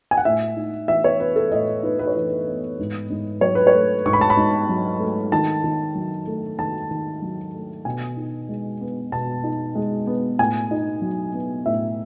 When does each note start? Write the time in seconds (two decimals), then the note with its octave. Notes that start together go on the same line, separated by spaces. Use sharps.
0.11 G#5
0.17 F#5
0.25 A2 E5
0.57 D#4
0.88 E3 E5
1.04 C#5
1.20 B3 B4
1.36 A4
1.51 A2 D#5
1.83 D#4 B4
1.99 B4
2.07 C#5
2.15 E3 B4
2.47 B3
2.79 G#2
3.10 G#2
3.41 F#3 C#5
3.55 B4
3.67 C#5
3.74 A3
4.06 G#2 C#6
4.13 B5
4.21 A5
4.30 B5
4.37 G#2
4.69 F#3
5.00 A3
5.32 D#3 A5
5.64 D#3
5.95 F#3
6.27 A3
6.59 D#3 A5
6.91 D#3
7.22 F#3
7.54 A3
7.85 B2 G#5
8.17 D#4
8.49 G#3
8.81 B3
9.12 B2 A5
9.44 D#4
9.75 G#3
10.07 B3
10.39 A2 G#5
10.71 D#4
11.02 F#3
11.34 B3
11.66 A2 E5